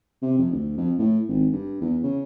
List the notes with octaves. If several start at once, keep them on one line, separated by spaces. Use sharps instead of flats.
C3
F2
D2
F2
A2
G#1
G2
E2
C#3